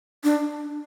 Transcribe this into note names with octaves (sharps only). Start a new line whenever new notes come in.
D4